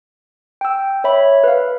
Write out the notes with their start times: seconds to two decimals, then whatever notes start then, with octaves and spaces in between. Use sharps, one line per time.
0.61 G5 E6
1.04 C#5 E5 B5
1.44 B4 F5